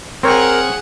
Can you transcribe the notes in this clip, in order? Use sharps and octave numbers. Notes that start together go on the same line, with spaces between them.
C4 G#4 A#4 C#5 F#5